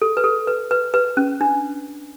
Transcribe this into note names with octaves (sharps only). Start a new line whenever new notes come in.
A4
B4
A4
B4
B4
B4
C#4
D4